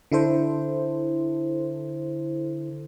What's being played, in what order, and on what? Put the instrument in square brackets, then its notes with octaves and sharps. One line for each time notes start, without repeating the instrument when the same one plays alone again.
[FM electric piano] D3 E4 A4 C5